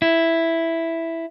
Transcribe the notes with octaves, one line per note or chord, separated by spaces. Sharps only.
E4